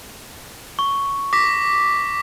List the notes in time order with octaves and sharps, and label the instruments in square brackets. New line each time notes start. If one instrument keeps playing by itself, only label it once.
[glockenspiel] C#6
[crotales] D6 B6 [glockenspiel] A#6